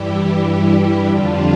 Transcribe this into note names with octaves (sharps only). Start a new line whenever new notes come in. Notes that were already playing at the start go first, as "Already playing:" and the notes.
Already playing: G2 E3 G3 E4 G4
F2 D3 G3 D4 F4